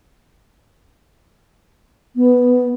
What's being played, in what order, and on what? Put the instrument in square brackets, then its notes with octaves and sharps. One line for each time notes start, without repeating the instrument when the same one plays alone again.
[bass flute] B3